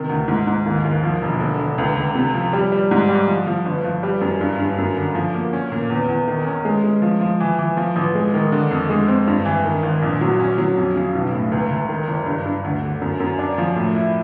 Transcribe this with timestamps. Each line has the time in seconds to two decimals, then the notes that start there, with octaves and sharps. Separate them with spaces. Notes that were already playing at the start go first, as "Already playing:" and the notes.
Already playing: C3 D#3
0.09 D2
0.28 G#2
0.47 G#2
0.66 D#2
0.85 D#2
1.03 F3
1.22 E1
1.40 D3
1.59 D3
1.78 C#2
1.96 C#2
2.15 C3
2.34 F3
2.53 G3
2.72 G3
2.91 G#2
3.09 G3
3.28 F3
3.47 F3
3.65 G1
3.84 F3
4.03 G3
4.21 F#2
4.41 G2
4.59 G2
4.78 F#2
4.97 D3
5.15 F3
5.34 A#3
5.53 C#4
5.72 A#2
5.90 E2
6.09 E2
6.28 D#3
6.46 C#4
6.65 G#3
6.84 G#3
7.02 F3
7.21 F3
7.40 E3
7.59 E3
7.77 F3
7.96 A1
8.15 G#3
8.34 D#3
8.52 D3
8.71 F2
8.90 G#3
9.08 C4
9.27 G2
9.45 E3
9.64 D#3
9.83 G#1
10.02 A#1
10.21 F#3
10.40 C#4
10.58 F#3
10.77 F2
10.96 C#3
11.15 B1
11.33 A2
11.52 C#2
11.71 C#2
11.89 D#3
12.08 F#1
12.26 G2
12.46 G2
12.64 D2
12.83 D3
13.01 F#2
13.20 F#2
13.39 D4
13.58 F3
13.76 A2
13.95 E4